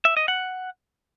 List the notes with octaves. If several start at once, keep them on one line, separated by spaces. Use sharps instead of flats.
E5
D#5
F#5